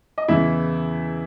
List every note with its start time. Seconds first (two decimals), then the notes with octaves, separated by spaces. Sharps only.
0.18 D#5
0.28 E2 C#3 E3 E4 E5